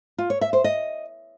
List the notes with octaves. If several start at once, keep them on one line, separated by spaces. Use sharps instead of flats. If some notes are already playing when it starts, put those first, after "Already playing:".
F4
C#5
E5
C5
D#5